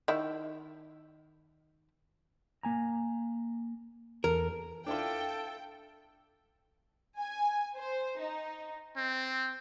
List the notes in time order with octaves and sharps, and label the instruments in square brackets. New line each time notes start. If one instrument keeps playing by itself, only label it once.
[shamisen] D#3 E4
[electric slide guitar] A#3 G#5 A#5
[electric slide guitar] E2 A4 [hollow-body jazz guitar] A#4
[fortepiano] D4 E4 F4 [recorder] A4 [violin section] G5
[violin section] G#5
C5
D#4
[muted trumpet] C4